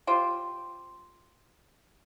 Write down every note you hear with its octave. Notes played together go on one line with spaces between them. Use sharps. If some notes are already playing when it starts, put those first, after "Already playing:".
F4 G4 C5